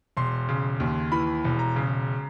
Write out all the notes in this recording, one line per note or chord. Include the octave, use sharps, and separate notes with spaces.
E1 C6
C#3
D#2
E3 B5
E1
A#5
C#3